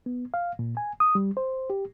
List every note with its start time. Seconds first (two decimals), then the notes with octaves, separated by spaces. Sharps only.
0.06 B3
0.34 F5
0.59 A#2
0.77 G#5
1.00 D#6
1.15 G3
1.37 C5
1.70 G4